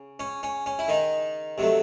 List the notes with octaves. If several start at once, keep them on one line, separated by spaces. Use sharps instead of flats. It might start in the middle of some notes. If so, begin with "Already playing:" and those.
Already playing: C#3
C#4
C#4
C#4
E4
D#3 D#4
C3 F#3 A3